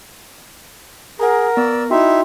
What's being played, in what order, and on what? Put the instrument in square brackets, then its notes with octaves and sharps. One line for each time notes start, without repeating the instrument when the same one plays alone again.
[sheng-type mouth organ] G#4 [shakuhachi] A#4 [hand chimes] F#5 A#5
[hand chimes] B3 [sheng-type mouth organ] D5 E6
[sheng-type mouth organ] D#4 E4 E5 [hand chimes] F#4 G5 C6